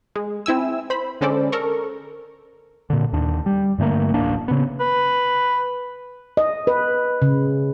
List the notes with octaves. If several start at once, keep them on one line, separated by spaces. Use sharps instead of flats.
G#3
C4 E4 G#5 E6
C5 B5
D3 G#3 C#4 A4 C5 D5
A4 A#4 C#6
A#2 D3
D#2 D4
G3
G2 D3 A3 A#3
D1 A1 A#3 D4
C#3 B3
B4
D#5
B4
C#3